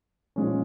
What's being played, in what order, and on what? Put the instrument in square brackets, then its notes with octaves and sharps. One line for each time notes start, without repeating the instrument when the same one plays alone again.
[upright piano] A#2 F3 G#3 C#4